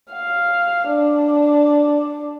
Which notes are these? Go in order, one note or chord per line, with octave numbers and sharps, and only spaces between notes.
F5
D4